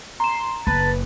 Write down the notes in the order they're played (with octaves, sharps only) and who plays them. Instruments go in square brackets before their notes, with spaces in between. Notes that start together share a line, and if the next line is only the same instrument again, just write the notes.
[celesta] A#5 E7 [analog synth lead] C6
[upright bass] F#1 [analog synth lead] B4 [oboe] A5